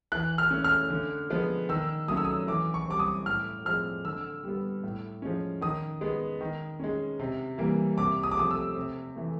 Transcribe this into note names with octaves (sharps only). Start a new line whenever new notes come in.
E3 F#6
F6
A3 C#4
F6
D3
F3 G#3 B3
D#3 E6
F#3 A3 C#4 D#6
E6
D#6
E3 D6
C#6
G3 C4 D6
D#6
A2 F6
F3 G#3 C4 F6
D3 E6
G3 B3
A2
F3 G#3 C#4
D#3 D#6
G#3 B3
D#3
G#3 C#4
C3
E3 G3 A#3
C3 D6
D#6
D6
F3 A3 C4 D#6
E6
C3
E3 A3